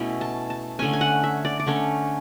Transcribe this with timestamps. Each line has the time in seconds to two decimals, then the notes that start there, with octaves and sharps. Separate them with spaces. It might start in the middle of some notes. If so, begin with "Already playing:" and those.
Already playing: B2 A3 C#4 E4
0.21 A5
0.50 A5
0.79 D3 A3 C#4 G#5
0.93 G#5
1.01 F#5
1.24 E5
1.45 D5
1.60 D5
1.67 D3 A3 C#4 C#5